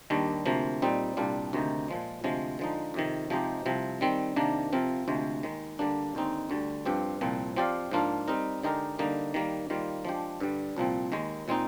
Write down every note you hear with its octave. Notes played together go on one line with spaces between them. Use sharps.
D#2 D#3 G3 D4
D2 C3 F3 A#3
A#2 G3 C4 D#4
C2 A#2 G3 D4 F4
D2 C3 D#3 A#3 D#4
A#2 F3 G#3
D2 C3 F3 G#3
D3 F3 G#3 D#4
F2 C3 D#3
C3 F3 G#3 D#4 G4
C2 C3 F3 C4
D#3 G3 C4
C3 D#3 A#3 D4
C3 F3 C4 F4 A#4
D2 C3 F3 G#3
D#2 D#3 G#3
D3 G3 A#3 D4
D#2 D3 G#3 C4 D#4
D2 D3 G3
G2 F3 C4 G4
C2 A#2 F3 C4
F3 C4 G4 D5 F5
G#2 F3 A#3 D4 F4
G3 C4 D#4 A#4
D3 G#3 D#4 G4 A#4
D3 G3 A#3 D#4
D#3 G3 A#3
D#3 G3 A#3 F4 C5
F3 G#3 D4 G4
G2 D3 G3
C2 A#2 F3 C4
D#2 D#3 G#3
A#2 G#3 C4 D#4